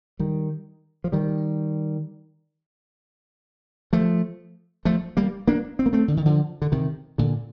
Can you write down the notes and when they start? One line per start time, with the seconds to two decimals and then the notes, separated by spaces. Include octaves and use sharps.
0.19 D#3 G3
1.04 F3
1.12 D#3 G3
3.93 F3 A3
4.85 F3 A3
5.17 G3 A#3
5.48 A#3 D4
5.79 C4
5.86 A#3
5.93 A3 C4
6.08 D3
6.17 D#3
6.26 D3 F3
6.62 D3
6.72 C3 D#3
7.18 A#2 D3